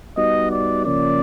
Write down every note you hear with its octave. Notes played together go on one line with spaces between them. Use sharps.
G3 B3 D#4 F#4 D#5
D5
C#3 F3 A#3 C#4 D5